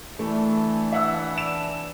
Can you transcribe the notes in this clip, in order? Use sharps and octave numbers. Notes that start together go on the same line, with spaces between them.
E3 A3 D4
E5 F#5 E6
E7